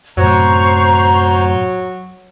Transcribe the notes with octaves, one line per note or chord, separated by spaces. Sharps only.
F#2 A2 C3 F#3 C5 A#5 C#6